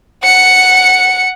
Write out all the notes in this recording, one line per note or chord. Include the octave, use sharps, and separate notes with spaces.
F#5 C#7